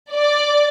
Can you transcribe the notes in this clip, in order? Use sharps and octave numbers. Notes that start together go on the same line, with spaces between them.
D5